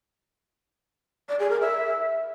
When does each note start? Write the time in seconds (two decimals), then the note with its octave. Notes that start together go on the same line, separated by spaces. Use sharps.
1.29 D5
1.39 G#4
1.50 A#4
1.61 E5